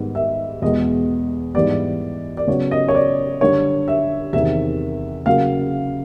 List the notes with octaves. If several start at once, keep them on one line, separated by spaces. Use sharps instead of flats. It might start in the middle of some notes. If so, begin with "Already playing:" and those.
Already playing: G#2 D#3 G3 B3
E5
E2 B2 G#3 B3 D#5
G#2 E3 G3 B3 D5
D5
C#3 F#3 B3 C#5
D#5
C#5
D5
F#2 D3 G3 C#5
E5
E2 C3 D#3 E5
C#3 F#3 A#3 F5